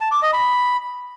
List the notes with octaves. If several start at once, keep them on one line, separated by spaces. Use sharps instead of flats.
A5
D6
D#5
B5